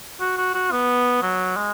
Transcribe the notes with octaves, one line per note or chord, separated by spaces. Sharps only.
F#4
F#4
F#4
B3
F#3
G#3